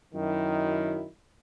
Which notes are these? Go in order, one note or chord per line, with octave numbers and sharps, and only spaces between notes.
F#2 D#3 E4